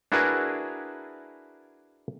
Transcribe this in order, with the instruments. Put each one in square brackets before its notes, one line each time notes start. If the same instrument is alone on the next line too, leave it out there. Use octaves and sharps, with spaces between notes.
[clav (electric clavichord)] D4 E4 F#4 G#4 A#4 B4